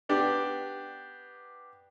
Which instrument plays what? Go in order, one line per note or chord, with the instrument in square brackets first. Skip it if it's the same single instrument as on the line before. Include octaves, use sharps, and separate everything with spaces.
[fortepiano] B3 D4 G4